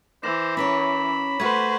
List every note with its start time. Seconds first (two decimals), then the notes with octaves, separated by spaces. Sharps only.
0.23 E3 C5 D6 A#6 E7
0.57 C#4 A#4 C#5 B5
1.40 A3 F#4 B4 C5 C#6 G#6 B6